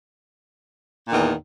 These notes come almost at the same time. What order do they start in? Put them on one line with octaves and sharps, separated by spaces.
A#2 D#3 E2